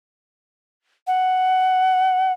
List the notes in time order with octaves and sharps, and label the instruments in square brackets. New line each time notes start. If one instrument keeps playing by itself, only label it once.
[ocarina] F#5